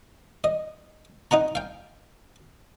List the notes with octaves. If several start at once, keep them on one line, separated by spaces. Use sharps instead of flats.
D#5
D#4 D#5 F#5 A#5
F5 G5